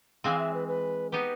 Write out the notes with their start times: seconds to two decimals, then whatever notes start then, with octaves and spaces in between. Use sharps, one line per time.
0.24 E3 G#3 C4 F5
0.39 E5
0.54 B4
0.68 B4
1.12 B3 D#4 G4 B4